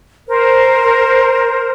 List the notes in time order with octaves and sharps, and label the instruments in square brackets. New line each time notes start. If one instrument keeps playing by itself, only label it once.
[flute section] A#4 C5